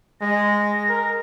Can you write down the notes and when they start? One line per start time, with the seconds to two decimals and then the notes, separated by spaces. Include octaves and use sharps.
0.21 G#3 A#6
0.89 A#4